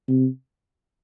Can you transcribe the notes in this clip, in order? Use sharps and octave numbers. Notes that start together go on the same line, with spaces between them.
C3